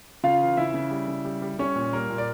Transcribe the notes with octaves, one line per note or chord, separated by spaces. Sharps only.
C#3 F4 F5
E3
C#3 E4 E5
C#3
G3
C#3
G3
G3
G3 C#4 C#5
A#2
G3 A#3 A#4
A#2
D5